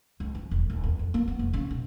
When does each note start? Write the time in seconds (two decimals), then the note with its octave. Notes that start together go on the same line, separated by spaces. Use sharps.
0.20 C#2
0.35 F3
0.51 E1
0.70 D1
0.83 E2
0.99 F2
1.14 A#3
1.28 B3
1.39 F1
1.53 C#3
1.71 B2